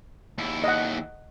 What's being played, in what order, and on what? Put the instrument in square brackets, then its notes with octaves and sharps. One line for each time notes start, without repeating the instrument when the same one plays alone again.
[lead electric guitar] D#2 E4
[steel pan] D#5 F#5